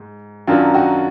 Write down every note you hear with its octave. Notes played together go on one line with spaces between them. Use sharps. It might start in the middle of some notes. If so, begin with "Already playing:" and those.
Already playing: G#2
F#2 D#3 F#3 D4 F4
D#4 F#4